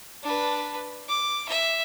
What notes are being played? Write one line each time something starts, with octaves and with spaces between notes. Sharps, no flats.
D4 B4
D6
E5